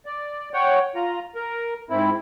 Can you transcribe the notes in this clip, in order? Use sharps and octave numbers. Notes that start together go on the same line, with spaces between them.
D5
C#5 F#5 G5
F4 A#5
A#4
G#2 C4 E4